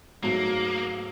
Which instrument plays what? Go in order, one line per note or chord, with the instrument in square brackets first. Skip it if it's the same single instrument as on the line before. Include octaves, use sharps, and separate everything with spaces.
[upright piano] G#2 F#3 A3 [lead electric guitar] A#3